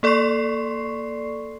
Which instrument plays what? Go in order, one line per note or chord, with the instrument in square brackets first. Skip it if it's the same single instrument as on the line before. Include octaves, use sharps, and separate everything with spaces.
[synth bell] A#3 A4 D5 C6 C#6 C7